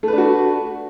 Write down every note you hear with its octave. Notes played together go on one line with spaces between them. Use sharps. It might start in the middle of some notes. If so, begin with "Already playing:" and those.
A3 D4 F#4 B4